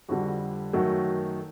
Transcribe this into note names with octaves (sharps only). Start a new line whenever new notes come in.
F2 D3 G3 F#4
F#2 D#3 F#3 A3 F#4